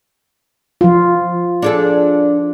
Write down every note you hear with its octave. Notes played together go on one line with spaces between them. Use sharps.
F3 F4
D4 G#4 A4